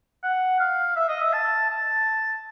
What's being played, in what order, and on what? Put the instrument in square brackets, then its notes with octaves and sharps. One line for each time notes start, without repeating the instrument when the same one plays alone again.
[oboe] F#5
F5
E5
D#5
E5
A5
A5